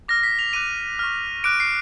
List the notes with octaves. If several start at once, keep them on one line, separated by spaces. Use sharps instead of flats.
D6 F6 A#6
B6
F7
D6 F#6 D#7
C#6 F6
D6 F#6 D7
C7